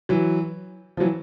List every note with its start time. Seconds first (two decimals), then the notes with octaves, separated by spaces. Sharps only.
0.09 E3 F#3
0.97 F3
1.00 E3 F#3